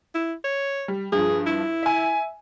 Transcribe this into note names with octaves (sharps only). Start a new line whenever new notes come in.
E4
C#5
G3
G2 F3 G#4
E4
E5 G#5